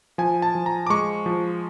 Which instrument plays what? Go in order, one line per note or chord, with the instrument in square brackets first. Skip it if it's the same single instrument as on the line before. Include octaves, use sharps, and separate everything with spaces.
[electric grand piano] F3 G#5
A5
F3
A#5
D6
G#3 C#6
F3